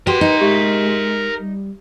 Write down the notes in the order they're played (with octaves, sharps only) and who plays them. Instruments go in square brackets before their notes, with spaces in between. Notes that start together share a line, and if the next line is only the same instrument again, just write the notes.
[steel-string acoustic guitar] F#4 G4 [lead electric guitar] A#4 C6 [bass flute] B4
[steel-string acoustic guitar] D#4
[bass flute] G#3 [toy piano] G4 E5
[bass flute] G3